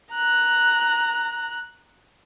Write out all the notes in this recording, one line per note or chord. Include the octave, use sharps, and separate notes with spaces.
A#5 F#6